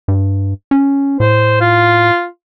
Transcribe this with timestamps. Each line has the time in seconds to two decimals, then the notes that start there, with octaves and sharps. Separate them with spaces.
0.08 G2
0.71 C#4
1.20 A2 C5
1.61 F4